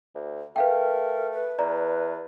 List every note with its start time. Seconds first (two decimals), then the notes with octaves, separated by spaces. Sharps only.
0.15 D2
0.56 A3 A#4 B4 F5 G5
1.33 B4
1.59 E2 D5 A#5